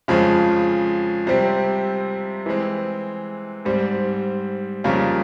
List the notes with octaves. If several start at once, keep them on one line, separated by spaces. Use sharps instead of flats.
F2 C#3 F3 G#3
C3 G3 C4 G4
E3 G#3 C4
G#2 G3 C4
F2 C#3 G3 A#3